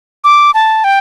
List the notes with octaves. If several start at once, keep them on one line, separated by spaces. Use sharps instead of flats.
D6
A5
G5